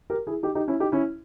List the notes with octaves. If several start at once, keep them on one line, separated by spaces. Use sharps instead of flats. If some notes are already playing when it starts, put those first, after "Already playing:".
G4 A#4
E4 G#4
D#4 G4
D#4 G4
C#4 E4
D#4 G4
C#4 E4